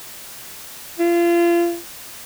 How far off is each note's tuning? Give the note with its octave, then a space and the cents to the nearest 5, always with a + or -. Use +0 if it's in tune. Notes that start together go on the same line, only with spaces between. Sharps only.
F4 -30